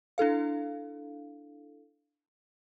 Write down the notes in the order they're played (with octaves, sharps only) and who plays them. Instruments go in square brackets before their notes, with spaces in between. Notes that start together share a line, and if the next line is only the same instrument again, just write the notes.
[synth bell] D4 E4 A4 F5